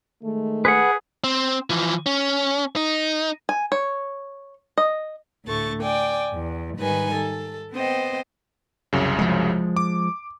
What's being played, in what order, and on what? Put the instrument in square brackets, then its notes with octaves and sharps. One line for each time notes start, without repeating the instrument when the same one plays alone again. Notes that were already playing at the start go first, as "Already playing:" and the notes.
[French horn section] D#3 G#3 A3
[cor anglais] G#4 [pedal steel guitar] B4 F#5
[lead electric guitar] C4
E3 F3
C#4
D#4
[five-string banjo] G#5
C#5
D#5
[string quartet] D2 A2 A3 C#6 A6
D5 G5 G#5
E2
G#2 D#3 G3 D#4 B4 G#5
A4
B3 C4 C5 D#5 G5
[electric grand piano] C2 F#2 C#3
[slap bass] F3 G#3
[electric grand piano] D6